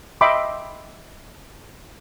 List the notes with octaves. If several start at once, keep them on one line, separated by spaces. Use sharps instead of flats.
D#5 E5 G5 B5 C6 D6